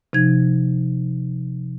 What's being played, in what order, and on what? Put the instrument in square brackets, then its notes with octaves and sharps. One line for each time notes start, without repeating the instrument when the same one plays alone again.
[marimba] C3 F3 D#4 G#6